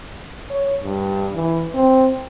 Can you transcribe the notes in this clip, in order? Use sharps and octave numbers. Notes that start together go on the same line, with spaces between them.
C#5
G2
E3
C4